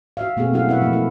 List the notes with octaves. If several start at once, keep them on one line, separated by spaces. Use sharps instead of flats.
F#4 E5 F5
B2 A3 A#3 C4 G#4
F#3 C#4 E4 F#4 F5 F#5
B2 B3 E4 B4 E5 F#5
F3 A3 A#3 E4
E4